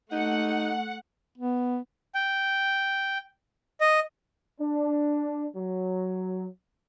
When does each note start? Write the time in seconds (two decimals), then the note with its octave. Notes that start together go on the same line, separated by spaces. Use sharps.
0.12 A3 D#4 F#5
1.37 B3
2.15 G5
3.81 D#5
4.60 D4
5.56 F#3